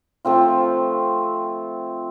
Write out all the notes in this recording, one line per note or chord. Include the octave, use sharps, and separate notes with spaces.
F3 A3 C4 F4